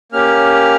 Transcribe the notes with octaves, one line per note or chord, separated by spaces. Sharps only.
A#3 C#4 G4 F6